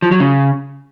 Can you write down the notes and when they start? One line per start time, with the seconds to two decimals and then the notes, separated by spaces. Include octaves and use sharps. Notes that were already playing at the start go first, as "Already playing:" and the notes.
0.02 F3
0.11 F#3
0.20 C#3